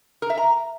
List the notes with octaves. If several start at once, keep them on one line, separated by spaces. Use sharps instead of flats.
A#4
E5
A#5